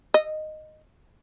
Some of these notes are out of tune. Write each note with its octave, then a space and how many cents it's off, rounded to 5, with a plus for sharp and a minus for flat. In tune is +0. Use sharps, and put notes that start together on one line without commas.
D#5 -10